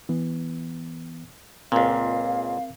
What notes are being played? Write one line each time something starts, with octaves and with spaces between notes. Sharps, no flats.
E3 B3
C#2 A#2 C4 A#4 F5